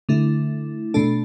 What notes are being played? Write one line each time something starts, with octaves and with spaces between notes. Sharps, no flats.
D3 A3 E4
B2 A3 D4 A4